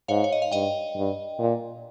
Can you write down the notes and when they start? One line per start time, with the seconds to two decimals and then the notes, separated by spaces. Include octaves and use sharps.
0.08 G#2 C#5 F5
0.24 C#5
0.32 D#5
0.42 F5
0.52 G2 D#5 G5
0.95 G2
1.39 A#2